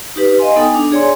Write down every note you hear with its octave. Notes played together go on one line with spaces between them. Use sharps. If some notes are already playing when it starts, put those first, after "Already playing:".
D#4 G4 B4
D#5 F5 G#5 C6
B3 D#4 A4 G5 G#5 D#6
D4
G#4 C#5 D5 G#5 C6